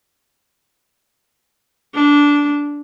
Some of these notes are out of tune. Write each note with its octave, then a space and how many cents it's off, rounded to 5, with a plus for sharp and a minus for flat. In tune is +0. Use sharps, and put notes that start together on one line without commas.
D4 -15